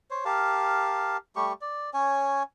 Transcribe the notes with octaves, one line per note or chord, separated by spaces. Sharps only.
C5 C#5
G4 A#4 F5 A5
G3 A3 G4 C#6
D5
C#4 C#5 G#5